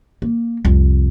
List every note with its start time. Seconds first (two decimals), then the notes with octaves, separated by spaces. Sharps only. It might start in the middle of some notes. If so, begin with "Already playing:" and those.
0.22 A#3
0.65 C2 F2